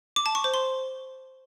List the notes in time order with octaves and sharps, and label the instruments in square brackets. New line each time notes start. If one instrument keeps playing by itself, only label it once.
[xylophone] D6
A5
C#6
C5
C6